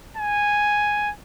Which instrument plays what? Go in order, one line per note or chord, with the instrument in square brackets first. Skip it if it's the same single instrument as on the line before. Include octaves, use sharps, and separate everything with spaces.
[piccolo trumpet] G#5